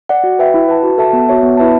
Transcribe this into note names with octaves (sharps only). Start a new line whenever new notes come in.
D5 F#5
F#4
B4 E5 G5
E4
B4 F#5 A5
F#4
A4 E5 A5
B3
F#4 C#5 E5
B3
E4 B4 E5 A5